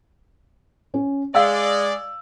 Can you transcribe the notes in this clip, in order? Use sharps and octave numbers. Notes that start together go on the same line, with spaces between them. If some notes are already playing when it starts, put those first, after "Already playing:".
C#4
G#3 D5 F5 G5 E6